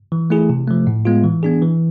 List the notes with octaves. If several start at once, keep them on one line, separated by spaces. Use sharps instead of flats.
E3
A3 E4 G#4
C3
F3 A3
A2
G#3 B3 F4
E3
B3 D4 G#4
E3